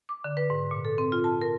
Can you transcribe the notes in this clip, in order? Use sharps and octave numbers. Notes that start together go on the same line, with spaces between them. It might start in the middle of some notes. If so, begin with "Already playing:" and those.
D6
D3
B4
G#2
A#2
A4
C4
F4
A5
A#4